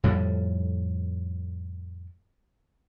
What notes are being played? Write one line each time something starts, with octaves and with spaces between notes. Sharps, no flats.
F2 A2 F3 G3